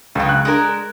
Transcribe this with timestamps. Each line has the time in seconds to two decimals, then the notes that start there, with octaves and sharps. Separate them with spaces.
0.15 C#2 F#2 C#3
0.29 F#6
0.45 G#3 D4 A#4